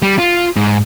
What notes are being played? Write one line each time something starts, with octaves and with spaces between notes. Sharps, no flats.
G3
F4
G#2